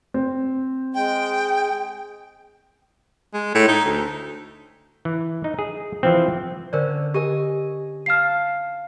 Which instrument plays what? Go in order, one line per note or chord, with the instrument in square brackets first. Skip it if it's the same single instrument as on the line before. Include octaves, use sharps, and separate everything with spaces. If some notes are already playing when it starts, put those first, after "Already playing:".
[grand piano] C4
[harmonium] G#3 [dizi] G5
[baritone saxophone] G#3
A2
D#4
D2
[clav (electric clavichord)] E3
D#4
G#4
E3 F3 C4
[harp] D3 C#4 [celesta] A#4 C5 D5
[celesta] G4 A#4 [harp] D#5 G#5
[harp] F5 A5 [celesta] F6 C7